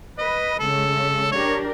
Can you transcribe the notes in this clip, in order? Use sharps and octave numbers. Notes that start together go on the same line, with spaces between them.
B4 D#5
C#3 G#3 C#4 A4
D4 G4 A#4 C#5